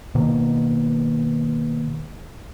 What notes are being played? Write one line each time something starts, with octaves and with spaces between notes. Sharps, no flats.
B2 D#3 A#3